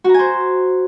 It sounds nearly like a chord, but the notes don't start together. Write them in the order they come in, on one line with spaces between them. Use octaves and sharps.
F#4 A#5 G#5 C5